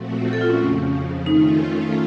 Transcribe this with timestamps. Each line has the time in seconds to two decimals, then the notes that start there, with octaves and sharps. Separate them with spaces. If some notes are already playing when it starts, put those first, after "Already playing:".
Already playing: A#2 F3 A3 C4 F#4
0.33 A4
0.41 F4
0.50 C#4
0.59 F2 C#3 F3
1.26 D#3 A3 C#4 D#4 F4